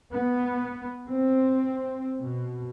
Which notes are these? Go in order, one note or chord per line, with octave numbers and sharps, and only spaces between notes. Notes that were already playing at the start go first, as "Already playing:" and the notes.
B3
C4
B2